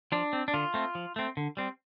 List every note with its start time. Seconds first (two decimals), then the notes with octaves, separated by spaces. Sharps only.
0.12 F3 D4
0.33 C4
0.48 D4
0.54 D3 F4
0.74 A3 C4
0.95 F3
1.16 A3 C4
1.37 D3
1.57 G3 C4